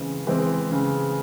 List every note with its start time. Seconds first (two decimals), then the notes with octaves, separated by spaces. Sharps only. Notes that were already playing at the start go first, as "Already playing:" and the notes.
Already playing: C#3 E3 G#3 C4
0.27 E3 G#3 C4
0.72 C#3